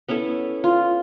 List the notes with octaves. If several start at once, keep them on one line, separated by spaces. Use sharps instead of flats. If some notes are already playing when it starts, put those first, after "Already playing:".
B3 C#4 E4 A4
F4